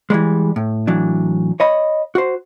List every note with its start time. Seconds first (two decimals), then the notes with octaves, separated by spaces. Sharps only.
0.10 E3 F3 G3 G#3
0.56 A2
0.87 A2 E3 F#3 D4
1.60 C#5 D#5 B5
2.15 F#4 C5